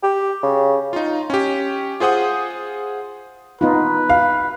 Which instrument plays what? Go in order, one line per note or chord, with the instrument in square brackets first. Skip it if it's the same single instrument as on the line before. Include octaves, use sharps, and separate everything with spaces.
[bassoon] G4
C#3
[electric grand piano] D#4 F4
C#4 G4
F4 G#4 C5 F#5 D#6
[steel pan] B3 D#4 F4 [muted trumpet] B4
[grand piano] F5